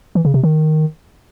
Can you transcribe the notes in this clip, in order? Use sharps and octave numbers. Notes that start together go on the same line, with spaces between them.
E3
C#3
C3
D#3